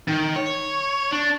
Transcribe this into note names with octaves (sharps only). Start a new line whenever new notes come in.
D#3
C#5
D4